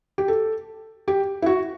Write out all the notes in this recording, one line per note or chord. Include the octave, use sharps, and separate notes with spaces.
G4
A4
G4
E4
F#4